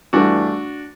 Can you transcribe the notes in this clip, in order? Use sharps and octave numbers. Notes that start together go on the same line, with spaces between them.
G2 E3 A3 D4 F#4